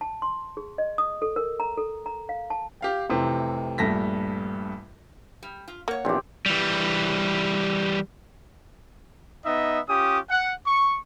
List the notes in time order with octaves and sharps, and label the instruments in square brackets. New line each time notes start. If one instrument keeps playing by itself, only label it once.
[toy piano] A5
C6
G#4
D#5
D#6
A4
A#4
A#5
A4
A#5
F5
A5
[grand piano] G4 F5 G5
F1 C3 E3 C4
A#1 G2 A3 A#6 B6
[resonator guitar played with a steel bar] G3
F4
[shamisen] A#3 [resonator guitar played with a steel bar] C#5 F#5
[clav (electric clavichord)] A#1 E2 [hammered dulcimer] C4 G4
[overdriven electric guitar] E3 G3
[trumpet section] B3 D#4 D#5 E5
C#4 F4 G4 D#6
F#5
C#6